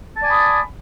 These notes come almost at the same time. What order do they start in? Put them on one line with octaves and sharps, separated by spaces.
A5 D5 G#5 B5 D#6